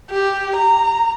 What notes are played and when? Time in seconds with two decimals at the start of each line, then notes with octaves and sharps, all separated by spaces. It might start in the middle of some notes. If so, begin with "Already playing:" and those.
0.10 G4
0.56 A#5